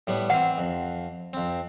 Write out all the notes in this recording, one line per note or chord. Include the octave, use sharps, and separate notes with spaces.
A2 G3 B3
E3 C4 F#5
F2
F2 C4